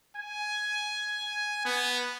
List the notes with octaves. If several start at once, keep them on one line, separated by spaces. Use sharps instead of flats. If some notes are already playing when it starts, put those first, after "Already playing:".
G#5
B3